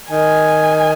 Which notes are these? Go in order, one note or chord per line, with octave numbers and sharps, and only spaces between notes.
D#3 G#5